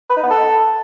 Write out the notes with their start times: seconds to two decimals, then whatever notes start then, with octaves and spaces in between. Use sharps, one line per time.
0.10 B4
0.17 D#4
0.23 B3
0.30 A4